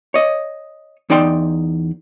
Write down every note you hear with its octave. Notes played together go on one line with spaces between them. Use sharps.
C#5 D#5
E2 D#4 D5 G5 C6